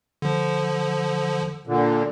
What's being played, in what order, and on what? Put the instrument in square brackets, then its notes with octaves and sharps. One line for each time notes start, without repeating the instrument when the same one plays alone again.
[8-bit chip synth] D3 F3
[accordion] A#2 D3